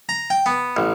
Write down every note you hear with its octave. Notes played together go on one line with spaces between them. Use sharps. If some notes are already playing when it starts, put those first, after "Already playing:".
A#5
G5
B3
A1